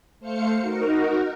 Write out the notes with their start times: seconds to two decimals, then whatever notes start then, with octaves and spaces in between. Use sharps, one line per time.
0.20 A3 C5 F5 C#7
0.59 D#4 F#4 A#4